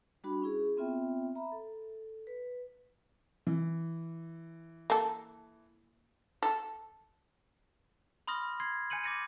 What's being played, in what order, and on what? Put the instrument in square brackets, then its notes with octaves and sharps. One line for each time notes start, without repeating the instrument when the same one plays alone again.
[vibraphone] G3 D4 F#4 B5
C#4 E4 G#4
B3 C4 F4 E5 G5
E5 A#5 B5
A4
B4
[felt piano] E3
[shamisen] A#3 A4
A4
[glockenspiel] B5 C6 D#6 F6 A#6
C6 G#6 C7
G#5 G6 C#7 D#7 F#7
D6 A6 A#6 C#7 D#7